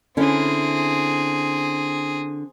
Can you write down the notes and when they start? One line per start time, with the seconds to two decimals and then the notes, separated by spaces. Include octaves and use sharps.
0.17 D3 C4 C#4 E4 G#4